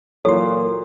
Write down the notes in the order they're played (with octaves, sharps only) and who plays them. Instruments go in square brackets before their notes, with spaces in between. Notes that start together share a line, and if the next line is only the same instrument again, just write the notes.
[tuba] A#2 [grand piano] E3 F#3 [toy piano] A4 [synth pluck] C#5 C6